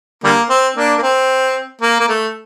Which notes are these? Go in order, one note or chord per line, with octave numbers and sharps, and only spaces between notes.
D3 G3 A#3
C4
A#3 D4
A#3
C4
A#3
A#3
A3